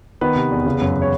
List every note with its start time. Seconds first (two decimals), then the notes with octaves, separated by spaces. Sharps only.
0.21 D#3 B3 B4
0.36 C3
0.51 E2
0.66 C#3
0.81 F#2
1.02 C#5